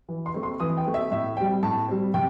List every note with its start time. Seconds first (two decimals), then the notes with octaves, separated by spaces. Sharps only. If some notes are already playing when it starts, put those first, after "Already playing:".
0.09 E3
0.26 C6
0.34 A3 C4
0.43 C6
0.60 E3 D#6
0.77 G5
0.85 A3 C4
0.94 E5
1.11 A2 E5
1.37 C4 G5
1.41 G3
1.63 A2 A5
1.88 G3 C4
2.14 C3 G5